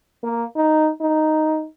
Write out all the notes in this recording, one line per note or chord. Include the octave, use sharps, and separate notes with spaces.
A#3
D#4
D#4